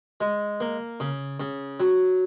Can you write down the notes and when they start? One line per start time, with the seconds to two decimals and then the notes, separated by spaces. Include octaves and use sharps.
0.21 G#3
0.60 A#3
1.00 C#3
1.40 C#3
1.80 F#3